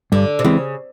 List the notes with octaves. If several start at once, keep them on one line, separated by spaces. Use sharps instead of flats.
G2 D3
C3
C#3 E3 G#3 C4